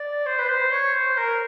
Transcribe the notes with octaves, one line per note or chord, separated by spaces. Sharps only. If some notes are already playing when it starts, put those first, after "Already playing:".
Already playing: D5
C5
B4
C5
C#5
C5
A#4